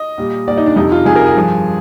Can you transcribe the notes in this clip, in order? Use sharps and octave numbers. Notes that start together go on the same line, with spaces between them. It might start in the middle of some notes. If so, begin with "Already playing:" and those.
Already playing: D#5
A#2 G3
A#2 G3 D5
D#4
D4
F2 C3 G3 D#4
F4
F2 C3 G3 G#4
A#4
G#4
G2 F3